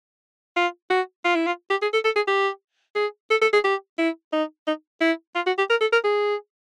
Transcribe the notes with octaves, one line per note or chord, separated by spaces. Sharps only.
F4
F#4
F4
E4
F4
G4
G#4
A4
A4
G#4
G4
G#4
A4
A4
G#4
G4
E4
D#4
D#4
E4
F4
F#4
G4
A#4
A4
A#4
G#4